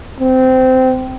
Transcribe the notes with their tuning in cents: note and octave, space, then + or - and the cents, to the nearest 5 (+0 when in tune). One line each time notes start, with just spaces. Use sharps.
C4 -20